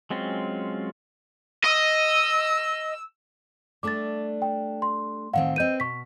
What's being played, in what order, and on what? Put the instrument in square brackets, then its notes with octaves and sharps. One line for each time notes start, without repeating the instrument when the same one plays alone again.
[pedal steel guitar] F#3 G#3 C4 C#4 F4
[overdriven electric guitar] D#5 [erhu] E6
[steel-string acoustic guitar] G3 A3 D4 [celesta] D6 A6
[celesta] G5
C6
[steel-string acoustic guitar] A2 D#3 C4 [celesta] F5 F#5
[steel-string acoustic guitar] C4 B4 [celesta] D#5 G6 D#7
[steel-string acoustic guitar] B2 [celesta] C#6 B6